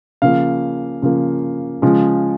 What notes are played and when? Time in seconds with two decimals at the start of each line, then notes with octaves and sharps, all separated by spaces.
0.22 C#3 F3 A#3 F5
1.02 C#3 F3 A#3
1.82 C#3 F3 G#3